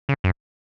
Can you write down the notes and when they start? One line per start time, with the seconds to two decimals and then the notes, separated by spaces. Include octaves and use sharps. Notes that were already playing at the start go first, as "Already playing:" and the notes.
0.09 C#3
0.24 F#2